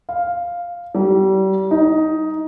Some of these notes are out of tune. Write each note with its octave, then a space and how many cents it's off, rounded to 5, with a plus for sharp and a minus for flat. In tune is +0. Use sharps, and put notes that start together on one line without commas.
F5 +0
G3 -35
D#4 +10